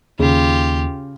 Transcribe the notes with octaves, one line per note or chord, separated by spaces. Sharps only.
D#2 C#3 F4 G4